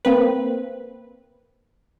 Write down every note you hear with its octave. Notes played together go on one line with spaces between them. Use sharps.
A#3 C4 B4